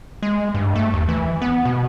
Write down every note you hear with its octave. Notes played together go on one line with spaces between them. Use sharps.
G#3
G2
A3
D#2
E3
B3
B2